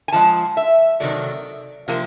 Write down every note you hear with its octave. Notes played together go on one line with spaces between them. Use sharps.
G#5
G#2 F3 G#3 A5
E5
C3 D#3 F#3 A3 D5
C3 F3 A#3